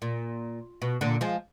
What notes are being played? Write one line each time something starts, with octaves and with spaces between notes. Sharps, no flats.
A#2
B2
A#2 D3
F3 G#3